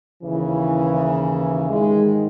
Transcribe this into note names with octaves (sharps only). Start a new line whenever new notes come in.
D#2 C#3 E3
G#2 D#3 G#3